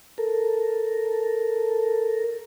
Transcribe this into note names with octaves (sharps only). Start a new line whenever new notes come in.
A4 A#4